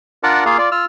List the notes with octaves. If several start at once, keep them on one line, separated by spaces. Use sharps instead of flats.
D4 F4 A#4 D5 F#5 A5
A#3 F4 G#4 F5
F4 D5
F4 E6 F6